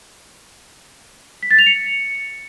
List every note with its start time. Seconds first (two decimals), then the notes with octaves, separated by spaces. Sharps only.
1.43 B6
1.51 A6
1.58 F7
1.66 C#7